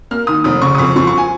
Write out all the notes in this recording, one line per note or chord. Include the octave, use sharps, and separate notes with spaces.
A#3 F6
D#3 D#6
F1 D#6
C#3 C#6
D#6
F2 C#6
F3 C#6
C#6
G#5